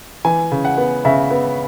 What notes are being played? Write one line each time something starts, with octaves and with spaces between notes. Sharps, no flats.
E3 G#5
C#3
F#5
B3
C#3 E5
B3